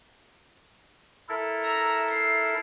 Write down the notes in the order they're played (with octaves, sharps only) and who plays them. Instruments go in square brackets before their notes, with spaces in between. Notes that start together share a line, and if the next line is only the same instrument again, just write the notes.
[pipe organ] E4 A4 A#4
[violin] E5 A#5
C7